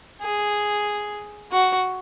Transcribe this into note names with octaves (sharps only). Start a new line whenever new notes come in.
G#4
F#4